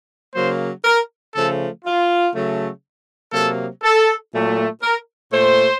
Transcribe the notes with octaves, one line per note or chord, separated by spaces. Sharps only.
C#3 F#3 A#3 C5
A#4
C#3 F3 A3 A4
F4
C#3 F#3 A3
C3 F#3 A#3 A4
A4
A#2 F#3 A3
A#4
A#2 A3 C5